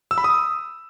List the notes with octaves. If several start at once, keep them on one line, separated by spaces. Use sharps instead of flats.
E6
B5
D#6